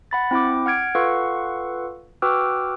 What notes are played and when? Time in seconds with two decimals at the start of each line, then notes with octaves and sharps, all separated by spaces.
0.11 F#5 B5 A6
0.31 C4 E4 G5 D6
0.66 F#5 F6 G#6 D7
0.95 F4 A4 B4 F5 F#5 C#6
2.22 F#4 B4 G5 D6 E6 F6